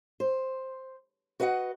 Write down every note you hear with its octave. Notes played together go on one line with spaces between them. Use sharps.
C5
F#4 B4 D#5 E5 F#5